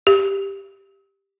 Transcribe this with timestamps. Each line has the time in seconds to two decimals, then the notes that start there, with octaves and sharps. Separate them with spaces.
0.07 G4